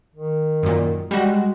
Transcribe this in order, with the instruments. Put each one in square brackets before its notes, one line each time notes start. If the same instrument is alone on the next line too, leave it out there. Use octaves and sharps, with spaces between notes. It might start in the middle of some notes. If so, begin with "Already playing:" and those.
[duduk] D#3
[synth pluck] F#2 A#2
[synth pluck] G3 F#4 [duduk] G#3